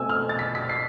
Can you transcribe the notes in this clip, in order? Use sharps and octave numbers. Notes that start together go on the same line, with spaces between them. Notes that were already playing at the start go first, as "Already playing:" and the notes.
Already playing: B2 A3 C4 G#5 E6
F6
A6
B6
B6
C7